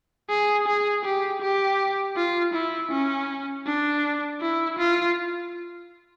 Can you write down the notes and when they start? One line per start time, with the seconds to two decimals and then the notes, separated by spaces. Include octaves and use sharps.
0.29 G#4
0.68 G#4
1.05 G4
1.42 G4
2.16 F4
2.54 E4
2.91 C#4
3.66 D4
4.41 E4
4.78 F4